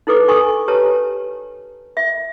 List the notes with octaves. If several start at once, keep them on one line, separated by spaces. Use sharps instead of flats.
D#4 E4 A4 B4 D6
D#4 A4 G#5 C#6 D#6
G4 B4 C#5 A5 A#5
E5